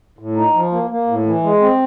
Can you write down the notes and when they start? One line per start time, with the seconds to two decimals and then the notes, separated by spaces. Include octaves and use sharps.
0.19 A2
0.37 D#4
0.54 F3
0.72 A#3
0.91 A#3
1.07 A2
1.26 E3
1.43 G#3
1.61 C4